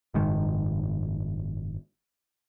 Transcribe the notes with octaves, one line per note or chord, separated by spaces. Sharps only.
F#1 G#2 D#3